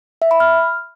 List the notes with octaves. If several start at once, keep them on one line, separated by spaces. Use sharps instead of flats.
E5
B5
F6